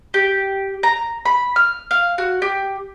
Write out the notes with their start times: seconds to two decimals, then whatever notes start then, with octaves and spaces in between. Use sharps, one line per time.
0.14 G4
0.83 A#5
1.25 B5
1.56 F6
1.91 F5
2.18 F#4
2.42 G4